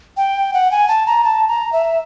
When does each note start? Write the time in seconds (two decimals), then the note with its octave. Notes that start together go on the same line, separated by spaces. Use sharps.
0.17 G5
0.54 F#5
0.71 G#5
0.88 A5
1.06 A#5
1.24 A5
1.48 A#5
1.73 E5